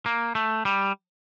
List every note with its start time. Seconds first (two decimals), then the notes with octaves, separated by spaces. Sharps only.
0.06 A#3
0.35 A3
0.65 G3